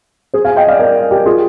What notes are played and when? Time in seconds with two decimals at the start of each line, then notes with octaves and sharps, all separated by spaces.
0.33 G#4 C5
0.45 F5 G#5
0.56 D#5 G5
0.68 D5 F5
0.79 A#4 D5
1.11 G4 A#4
1.26 F4 G#4